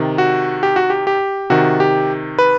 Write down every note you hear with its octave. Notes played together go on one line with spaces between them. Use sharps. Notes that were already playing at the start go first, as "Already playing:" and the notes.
Already playing: C3 D#3
F#4
G4
F#4
G4
G4
C3 D#3 F#4
G4
B4